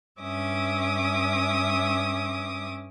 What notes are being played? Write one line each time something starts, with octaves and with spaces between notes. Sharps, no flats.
G2 C#4 E5 D6 D#6